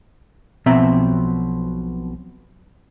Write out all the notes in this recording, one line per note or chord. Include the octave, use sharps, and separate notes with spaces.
B1 B2 F3 C4 E5 A#5